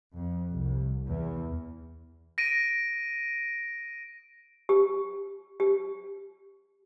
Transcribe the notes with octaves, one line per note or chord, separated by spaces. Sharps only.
F2
C2
E2
A#6 D7 D#7
G4
G4